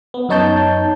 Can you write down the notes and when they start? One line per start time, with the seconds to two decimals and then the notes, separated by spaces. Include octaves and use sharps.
0.14 B3
0.29 F#2 B3 D#4 C#5 A5 G6